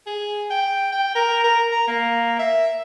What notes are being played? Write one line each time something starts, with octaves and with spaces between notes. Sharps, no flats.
G#4
G5
G5
A#4
A#4
A#5
A#3
E5